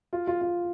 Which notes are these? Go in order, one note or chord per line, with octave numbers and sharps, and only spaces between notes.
F4
F4
F4